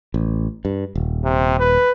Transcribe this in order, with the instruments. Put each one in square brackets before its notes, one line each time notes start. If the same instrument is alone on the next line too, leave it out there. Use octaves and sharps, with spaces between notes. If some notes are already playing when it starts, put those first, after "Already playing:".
[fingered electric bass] A1
G2
D#1
[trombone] C3
B4